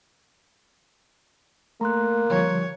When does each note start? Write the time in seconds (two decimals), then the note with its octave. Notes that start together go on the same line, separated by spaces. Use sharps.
1.81 A3 A#3 A#5 C6 F#6
2.30 D3 F3 G3 C#5